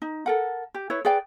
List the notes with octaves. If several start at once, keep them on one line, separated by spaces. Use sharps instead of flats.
D#4
A4 A#4 F#5
G4
E4 B4 C#5
G#4 B4 D5 G5